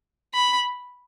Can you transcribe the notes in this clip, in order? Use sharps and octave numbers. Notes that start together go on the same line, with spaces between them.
B5